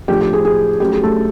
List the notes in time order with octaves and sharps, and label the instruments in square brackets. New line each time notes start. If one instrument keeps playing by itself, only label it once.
[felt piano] A2 F3 A3 D4 F4 G4
G4
G#4
G#4
F#3 A3 C#4 G4
G#4
A3 A4